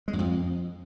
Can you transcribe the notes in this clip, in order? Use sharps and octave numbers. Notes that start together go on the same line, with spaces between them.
G#3
F#2
F2